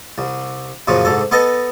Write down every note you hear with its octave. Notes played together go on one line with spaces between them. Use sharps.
C2
F#2 A#2 C#3 F3
C2 G#2 A4
B3 A4 D#5 A5